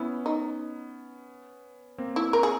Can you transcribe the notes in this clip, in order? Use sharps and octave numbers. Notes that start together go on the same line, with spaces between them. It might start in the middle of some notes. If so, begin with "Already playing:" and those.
Already playing: B3 C#4 E4
D#4
A#3 C4
E4
A#4
G#4